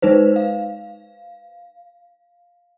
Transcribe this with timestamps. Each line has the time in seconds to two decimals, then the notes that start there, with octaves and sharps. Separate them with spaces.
0.02 G#3 D#4 B4 C5
0.36 F5